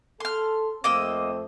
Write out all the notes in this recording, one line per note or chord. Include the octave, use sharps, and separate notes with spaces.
A4 C6 F6
F2 A3 A#3 C4 D#5 E6